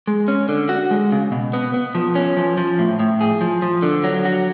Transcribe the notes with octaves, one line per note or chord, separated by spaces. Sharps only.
G#3
C#4
D3
F#4
G#3
C#3
B2
B3
B3
F3
C#4
F3
F3
A2
A2
G#4
F3
F3
D3
F#3
F#4